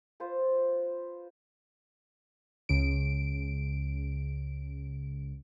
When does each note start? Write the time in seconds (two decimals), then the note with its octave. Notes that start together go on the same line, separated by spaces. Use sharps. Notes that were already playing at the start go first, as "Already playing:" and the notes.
0.20 F4 B4 C5
2.69 C#2 C#3 D7